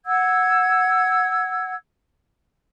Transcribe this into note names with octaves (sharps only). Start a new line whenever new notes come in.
F#5 E6 G#6